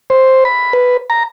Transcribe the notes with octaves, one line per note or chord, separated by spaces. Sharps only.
C5
B5
B4
A#5